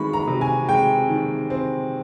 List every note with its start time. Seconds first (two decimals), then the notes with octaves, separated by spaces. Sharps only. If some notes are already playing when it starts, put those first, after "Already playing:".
Already playing: D#3 G#3 B5 C#6
0.13 A#5
0.27 C3
0.41 G#5
0.68 G#3 G5
1.09 D#3
1.50 C4